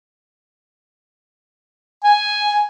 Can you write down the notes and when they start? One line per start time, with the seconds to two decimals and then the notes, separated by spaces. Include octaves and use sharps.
2.04 G#5